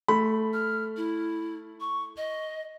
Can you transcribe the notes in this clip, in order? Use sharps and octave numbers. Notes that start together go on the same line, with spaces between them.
A3 B5
F6
E4
C#6
D#5